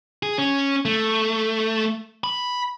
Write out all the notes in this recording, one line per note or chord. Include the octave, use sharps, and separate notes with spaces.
G#4
C#4
A3
B5